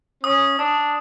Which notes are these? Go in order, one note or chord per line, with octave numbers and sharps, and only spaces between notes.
C#4 D#6
D4 D#6